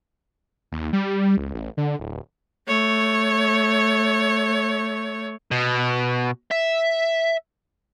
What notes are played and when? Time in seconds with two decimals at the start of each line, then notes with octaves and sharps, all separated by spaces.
0.72 D#2
0.93 G3
1.37 C#2
1.54 A1
1.77 D3
1.99 D1
2.68 A3 C#5
5.51 B2
6.51 E5